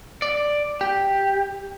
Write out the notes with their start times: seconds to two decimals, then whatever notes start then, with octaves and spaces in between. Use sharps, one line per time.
0.22 D5
0.81 G4